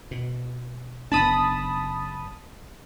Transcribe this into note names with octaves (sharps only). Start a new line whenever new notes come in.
B2
F#1 B3 D4 A5 B5 D#6